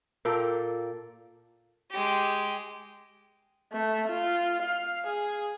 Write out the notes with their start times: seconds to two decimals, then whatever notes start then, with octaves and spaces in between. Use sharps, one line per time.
0.25 A#2 A#3 A4 G5
1.91 G#3 G4
3.72 A3
4.08 F4
4.62 F5
5.07 G#4